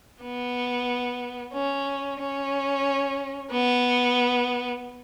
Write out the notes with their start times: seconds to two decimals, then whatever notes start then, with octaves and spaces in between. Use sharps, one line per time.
0.23 B3
1.54 C#4
2.20 C#4
3.51 B3